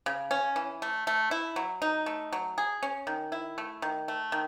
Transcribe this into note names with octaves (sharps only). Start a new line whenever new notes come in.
C#3
C#4
E3
A3
A3
E4
F#3
D#4
A3
F#3
G#4
C#4
D#3
E4
A3
D#3
A3
D#3